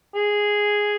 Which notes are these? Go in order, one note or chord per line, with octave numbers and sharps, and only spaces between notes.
G#4